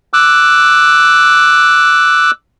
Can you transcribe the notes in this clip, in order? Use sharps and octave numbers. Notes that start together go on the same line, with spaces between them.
D6 E6 F#6